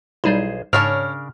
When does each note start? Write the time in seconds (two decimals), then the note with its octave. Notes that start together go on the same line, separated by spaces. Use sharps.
0.24 B1 G3 D#4 E4 G#4 C5
0.73 G#2 C#3 C#4 D4 A#4 C#5 A5 F6